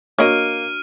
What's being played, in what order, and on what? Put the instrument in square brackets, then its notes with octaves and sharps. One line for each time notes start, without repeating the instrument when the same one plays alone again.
[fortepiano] A#3 [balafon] D4 F#4 [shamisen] C#5 D#5 [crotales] F6 D7 D#7